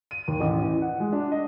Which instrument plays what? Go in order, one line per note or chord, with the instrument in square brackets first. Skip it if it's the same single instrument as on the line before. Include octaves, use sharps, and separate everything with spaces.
[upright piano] D#7
D#2
A1
E3
F#5
G#3
D4
D#5